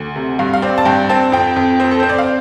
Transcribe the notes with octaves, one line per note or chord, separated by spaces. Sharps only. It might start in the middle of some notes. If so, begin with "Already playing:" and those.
Already playing: D2
C3
G2 F5
F5
C4 D5
A5
G2 G5
C4 A5
F2 G5
F2
C4
A4
C4 C5
D5
F5